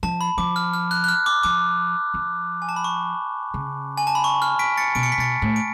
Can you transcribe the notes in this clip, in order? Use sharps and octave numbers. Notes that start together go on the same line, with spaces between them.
F3 A5
B5
F3 D6
F6
F6
F#6
F#6
F6
D6
F3 D6
F3
G#5
A5
B5
C#6
C#3
G#5
A5
B5
C#6
F6
B6 D7
A6 C#7
B2 D7
C#7
B6
B2 A6 C#7
A2
D7